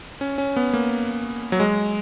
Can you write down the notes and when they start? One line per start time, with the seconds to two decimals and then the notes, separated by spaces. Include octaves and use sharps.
0.21 C#4
0.38 C#4
0.56 B3
0.73 A#3
1.52 F#3
1.60 G#3